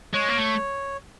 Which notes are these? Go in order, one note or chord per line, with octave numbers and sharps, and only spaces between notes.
G#3 C#5
A#3
A3